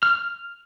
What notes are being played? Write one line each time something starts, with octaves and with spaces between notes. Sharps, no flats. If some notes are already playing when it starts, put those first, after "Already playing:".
F6